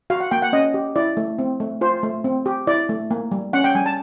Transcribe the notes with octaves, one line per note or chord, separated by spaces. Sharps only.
F#4 F5
F#5
A#3 G5
F#5
C#4 D#5
G4
E4 D5
A3
C4
A3
F4 C5
A3
C4
G4
E4 D5
A3
A#3
G3
C#4 F#5
G5
G3 G#5
A5